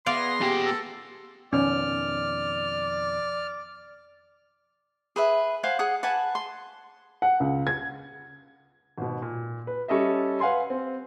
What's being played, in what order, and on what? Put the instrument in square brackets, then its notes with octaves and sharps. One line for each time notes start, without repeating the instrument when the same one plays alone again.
[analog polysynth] B3 G#4 A#6 [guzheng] D5 F5 [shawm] C6
[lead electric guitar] A#2 G4
[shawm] A4
[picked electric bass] F2 B2 D#3 [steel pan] C#4 [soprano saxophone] D5 [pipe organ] F6
[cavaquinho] G#4 B4 E5
C5 F5 F#5 G#5
G#4 F#5 D#6
B4 F#5 G#5 A5
C6
[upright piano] F#5
C#2
G#6
[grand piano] G#1 B2
A#2
B4
G3 C#4 A4 D#5 E5
B4 F5 F#5 G#5 C6
C4